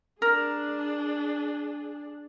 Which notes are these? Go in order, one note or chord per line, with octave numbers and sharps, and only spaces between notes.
D4 G#4 A#4